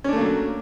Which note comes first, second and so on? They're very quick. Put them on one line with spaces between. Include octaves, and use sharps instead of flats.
C#4 D4 A3 A#3 F#3